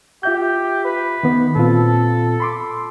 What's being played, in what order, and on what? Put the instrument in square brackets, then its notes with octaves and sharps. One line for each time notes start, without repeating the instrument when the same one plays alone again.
[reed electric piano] F4 E5 G6 [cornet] G4
[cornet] B4
[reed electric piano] D#3 B3
[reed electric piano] A#2 C4 F4 [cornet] A4
[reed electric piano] B5 C6 D6